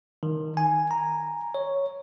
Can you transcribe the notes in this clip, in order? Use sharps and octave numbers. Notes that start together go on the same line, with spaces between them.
D#3
G#5
A#5
C#5